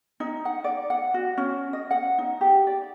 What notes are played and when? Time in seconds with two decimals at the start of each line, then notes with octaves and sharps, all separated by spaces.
0.20 D#4
0.45 F#5
0.64 D5
0.90 F#5
1.14 F#4
1.38 C#4
1.73 D#5
1.91 F#5
2.18 D#4
2.41 G4
2.67 D5